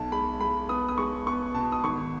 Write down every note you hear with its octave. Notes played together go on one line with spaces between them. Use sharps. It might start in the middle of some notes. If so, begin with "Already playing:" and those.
Already playing: B1 B2 A5
G#3 B5
G#3 B5
B3 D#6
D#6
G#3 C#6
B3 C#6
B2 A5
D#6
G#1 C#6